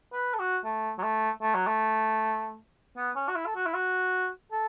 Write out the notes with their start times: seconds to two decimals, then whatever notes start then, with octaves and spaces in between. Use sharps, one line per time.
0.13 B4
0.34 A4
0.39 F#4
0.64 A3
0.98 F#3
1.03 A3
1.42 A3
1.54 F#3
1.67 A3
2.97 B3
3.16 C#4
3.28 F#4
3.35 E4
3.46 A4
3.55 F#4
3.66 E4
3.74 F#4
4.52 A4